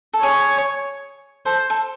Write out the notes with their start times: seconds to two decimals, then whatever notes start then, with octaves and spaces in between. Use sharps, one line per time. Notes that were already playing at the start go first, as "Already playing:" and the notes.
0.13 A4
0.22 G#4 C#5
1.46 A4 C5
1.70 A4